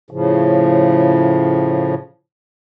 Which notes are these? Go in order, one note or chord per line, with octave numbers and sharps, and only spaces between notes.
A2 C#3 F3